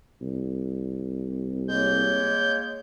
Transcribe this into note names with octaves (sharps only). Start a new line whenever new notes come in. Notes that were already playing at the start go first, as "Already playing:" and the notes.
C2
G#3 A#3 C#5 G6